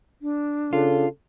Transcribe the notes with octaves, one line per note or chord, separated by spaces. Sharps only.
D4
C#3 F4 A4